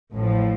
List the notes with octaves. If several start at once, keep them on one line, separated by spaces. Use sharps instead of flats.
A1 A2 F3